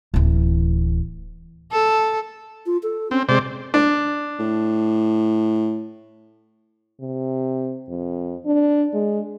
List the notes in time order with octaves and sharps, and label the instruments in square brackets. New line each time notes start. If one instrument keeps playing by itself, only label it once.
[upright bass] D1 E3
[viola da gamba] A4
[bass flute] F4
A4
[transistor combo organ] C4 [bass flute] C#4
[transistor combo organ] C3 C5 D5 [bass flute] G#3
[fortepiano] D4
[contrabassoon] A2
[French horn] C3
F2
D4
G#3